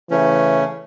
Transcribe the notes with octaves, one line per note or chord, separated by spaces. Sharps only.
C#3 E3 A3 C#4